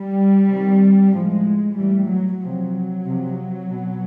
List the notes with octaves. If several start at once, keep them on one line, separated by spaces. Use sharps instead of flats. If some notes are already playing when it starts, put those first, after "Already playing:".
Already playing: G3
C3 D#3
A2 F3 G#3
A2 E3 G3
F#3
C3 F3 F#3
C3 F3
B2